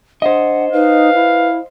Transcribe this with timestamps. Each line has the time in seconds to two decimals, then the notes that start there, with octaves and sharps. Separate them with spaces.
0.22 D4 C5 D#5 F#5
0.72 D#4 B4 F5
1.14 E4